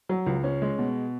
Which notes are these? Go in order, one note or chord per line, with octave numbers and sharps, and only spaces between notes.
F#3
C#2
C#4
G#3
B2